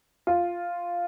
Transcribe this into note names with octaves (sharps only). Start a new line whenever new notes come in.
F4